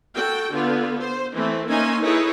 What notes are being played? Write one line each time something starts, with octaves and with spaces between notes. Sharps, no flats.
F#4 A4 G5
D3 B3 F4
C5
E3 A3 C4
A#3 C#4 D#4 E5 G#5 C6
D#4 E4 G#4 A4 B4 C#5